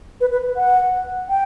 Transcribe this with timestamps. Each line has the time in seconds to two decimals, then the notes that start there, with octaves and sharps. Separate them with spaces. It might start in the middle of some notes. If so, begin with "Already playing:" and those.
0.21 B4
0.32 B4
0.57 F#5
1.29 G5